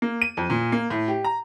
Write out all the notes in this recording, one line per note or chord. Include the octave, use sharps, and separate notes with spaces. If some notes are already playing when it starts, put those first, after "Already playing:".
A#3
D#7
F2
A#2
A#3
A2
G4
A#5